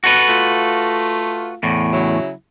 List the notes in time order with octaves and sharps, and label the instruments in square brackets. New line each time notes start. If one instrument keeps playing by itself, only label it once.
[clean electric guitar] F#4 A4 B4
[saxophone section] A3 F4
[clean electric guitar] E2 A2
[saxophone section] C#3 F#3 E4